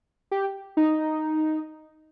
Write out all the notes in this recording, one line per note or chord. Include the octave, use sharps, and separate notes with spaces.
G4
D#4